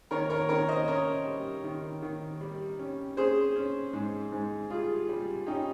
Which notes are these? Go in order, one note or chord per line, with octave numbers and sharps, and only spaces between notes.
D#3 A#4 C#5
A#4 C#5
D#3 A#4 C#5
C5 D#5
C#4 A#4 C#5
G3
D#3
D#3
G3
C#4
C#4 G#4 C5
C#4
G#2
G#2
G3 F4 G#4
G3
C#4 D#4 G4